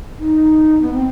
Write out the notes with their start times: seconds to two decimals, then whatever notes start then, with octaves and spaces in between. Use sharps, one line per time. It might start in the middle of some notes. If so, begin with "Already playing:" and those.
0.19 D#4
0.82 B3
0.93 C4